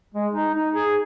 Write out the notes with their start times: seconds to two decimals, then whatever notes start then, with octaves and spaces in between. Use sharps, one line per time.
0.14 G#3
0.32 D#4
0.54 D#4
0.75 G#4